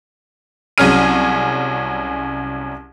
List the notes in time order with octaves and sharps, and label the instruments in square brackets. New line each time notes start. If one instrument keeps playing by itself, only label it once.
[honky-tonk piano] C2 F#3 C#4 G#4 F6 D#7